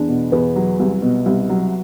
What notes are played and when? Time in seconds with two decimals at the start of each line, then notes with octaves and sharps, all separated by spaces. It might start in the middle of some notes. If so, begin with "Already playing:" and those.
Already playing: E2 D4
0.09 B2
0.32 E2 B3
0.56 F#3
0.80 C2
1.02 B2
1.26 C2
1.49 F#3